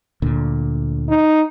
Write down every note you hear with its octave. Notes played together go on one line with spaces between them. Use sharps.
D2 A#2 D3
D#4